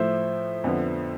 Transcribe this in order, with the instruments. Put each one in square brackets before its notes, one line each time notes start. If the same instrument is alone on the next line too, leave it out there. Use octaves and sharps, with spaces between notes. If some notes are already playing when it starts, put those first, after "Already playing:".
Already playing: [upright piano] A2 F3 A3 E4 [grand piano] C5 E5
[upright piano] F2 D3 F3 B3